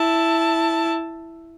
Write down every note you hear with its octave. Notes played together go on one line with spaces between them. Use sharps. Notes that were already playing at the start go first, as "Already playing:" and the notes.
Already playing: E4 A5